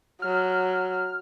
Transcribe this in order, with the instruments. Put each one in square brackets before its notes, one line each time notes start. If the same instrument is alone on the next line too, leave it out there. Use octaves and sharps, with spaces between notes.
[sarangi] F#3 [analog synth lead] F6